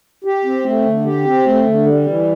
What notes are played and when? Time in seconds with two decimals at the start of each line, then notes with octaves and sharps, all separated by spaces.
0.25 G4
0.45 C4
0.65 A3
0.85 D3
1.05 G4
1.25 C4
1.46 A3
1.66 D3
1.86 G3
2.06 E3